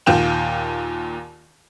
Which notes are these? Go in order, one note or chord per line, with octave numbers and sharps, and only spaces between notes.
D#2 A#2 F5 G5 E7